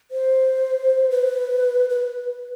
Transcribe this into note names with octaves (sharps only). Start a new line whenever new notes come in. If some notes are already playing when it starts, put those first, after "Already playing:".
C5
B4
B4